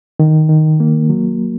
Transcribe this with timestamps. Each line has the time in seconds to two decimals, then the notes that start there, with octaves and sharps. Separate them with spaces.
0.19 D#3
0.49 D#3
0.80 A#3
1.10 F#3